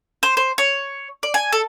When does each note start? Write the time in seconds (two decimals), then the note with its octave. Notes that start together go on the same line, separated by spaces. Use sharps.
0.23 C5
0.37 C5
0.58 C#5
1.23 D5
1.34 G#5
1.52 A4